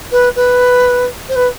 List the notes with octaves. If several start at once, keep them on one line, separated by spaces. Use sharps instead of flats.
B4
B4
C5
B4